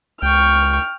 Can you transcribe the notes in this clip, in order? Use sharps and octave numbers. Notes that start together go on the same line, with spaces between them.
C#2 G5 C#6 F6